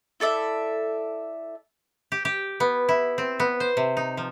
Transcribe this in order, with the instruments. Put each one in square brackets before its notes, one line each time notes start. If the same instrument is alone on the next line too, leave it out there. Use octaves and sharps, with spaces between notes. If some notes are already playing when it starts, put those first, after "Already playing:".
[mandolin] E4 A4 D5 E5
[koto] G4
G4
B3
E4
C4
B3
C5
C3
D#4
F3